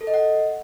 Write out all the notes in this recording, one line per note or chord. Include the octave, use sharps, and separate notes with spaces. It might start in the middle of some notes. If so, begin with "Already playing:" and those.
A4
D#5
F#5